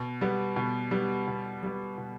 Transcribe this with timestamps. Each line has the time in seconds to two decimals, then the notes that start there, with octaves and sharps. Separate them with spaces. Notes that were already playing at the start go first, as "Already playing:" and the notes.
Already playing: B2
0.21 G3 B3
0.56 B2
0.91 G3 B3
1.27 B2
1.63 G3 B3
1.98 B2